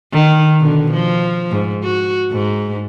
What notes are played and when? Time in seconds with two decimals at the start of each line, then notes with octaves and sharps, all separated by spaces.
0.13 D#3
0.59 B2 D3
0.92 F3
1.51 G#2
1.83 F#4
2.31 G#2